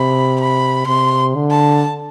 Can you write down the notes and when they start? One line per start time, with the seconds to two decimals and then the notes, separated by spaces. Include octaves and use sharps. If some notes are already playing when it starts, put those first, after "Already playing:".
Already playing: C3 B5
0.40 B5
0.87 C3 C6
1.35 D3
1.50 A5